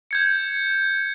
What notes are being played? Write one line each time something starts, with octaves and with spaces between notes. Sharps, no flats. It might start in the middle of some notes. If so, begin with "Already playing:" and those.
G6 G#6 C#7